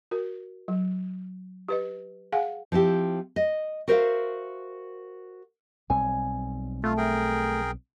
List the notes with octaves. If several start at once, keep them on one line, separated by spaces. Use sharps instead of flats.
F#4 A#4
F#3
G4 B4 D#5
G#4 F5 F#5 G#5
F3 C4 E4 G4
D#5
F#4 A#4 C5 C#5 E5 F5
B1 G3 C4 G#5
A3 F4
G#4 A#4 G5